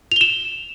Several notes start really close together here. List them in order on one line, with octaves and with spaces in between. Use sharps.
F7 G7 E7